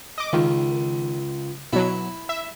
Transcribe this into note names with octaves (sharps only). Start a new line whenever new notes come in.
D#5 D6
C#2 D#3
B2 F#3 E4
E5